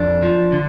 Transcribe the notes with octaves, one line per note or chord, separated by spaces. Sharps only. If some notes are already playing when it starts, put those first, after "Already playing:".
Already playing: F2 D4
F3
D3